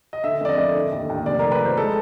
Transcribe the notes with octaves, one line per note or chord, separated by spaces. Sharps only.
D#5
D3 E5
F2 D5
D#5
F2
D3
D#2
D#2
F1 D5
D#2 A#4
B4
F3 C5
G#3 A4